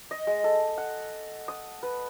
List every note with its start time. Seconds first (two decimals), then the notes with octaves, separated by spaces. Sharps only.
0.11 D#5
0.27 G#3
0.44 A4
0.78 F#5
1.48 D#6
1.83 B4